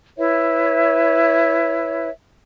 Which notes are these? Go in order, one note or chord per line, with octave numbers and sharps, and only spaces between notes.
E4 B4 C#5 E5